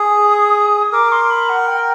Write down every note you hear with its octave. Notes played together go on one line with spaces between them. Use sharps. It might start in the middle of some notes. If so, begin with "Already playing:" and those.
Already playing: G#4 D#6
A#4 D6
C6
B5
F#5
G5